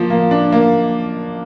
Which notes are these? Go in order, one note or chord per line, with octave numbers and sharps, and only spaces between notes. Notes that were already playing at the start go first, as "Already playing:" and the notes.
Already playing: F3 A#3
A#3
D4
A#3